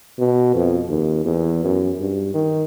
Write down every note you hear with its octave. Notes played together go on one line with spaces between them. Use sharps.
B2
F2
D#2
E2
F#2
G2
D#3